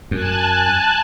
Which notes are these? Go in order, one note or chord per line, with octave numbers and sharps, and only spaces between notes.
F#2 G#5 A5 F#6